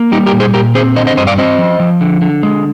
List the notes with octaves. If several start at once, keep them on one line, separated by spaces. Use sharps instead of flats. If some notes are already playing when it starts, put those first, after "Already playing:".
Already playing: A#3
G3 D#4 G4
G4 A#4
A#2
G#4 C5
A#2 G4 A#4
C4 G#4 C5
D3 C5 D#5
C5 D#5
G2 C5 D#5
D5 F5
C4 C5 D#5
F3
F3
D3
D3
G#3